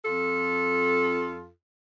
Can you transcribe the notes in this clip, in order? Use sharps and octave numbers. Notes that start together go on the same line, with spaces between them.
F2 F4 A4